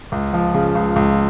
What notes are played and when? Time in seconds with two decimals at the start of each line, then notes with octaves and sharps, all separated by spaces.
0.12 C#2
0.33 F3
0.54 C#3
0.75 C#2
0.96 C#2